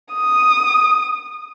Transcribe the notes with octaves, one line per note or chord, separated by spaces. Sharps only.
D#6